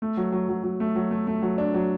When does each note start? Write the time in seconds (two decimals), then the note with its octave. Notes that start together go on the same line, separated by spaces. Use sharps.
0.02 A3
0.17 F#3
0.32 F#3
0.49 F#3
0.63 F#3
0.80 A3
0.96 F#3
1.11 A3
1.27 A3
1.42 F#3
1.58 D4
1.74 F#3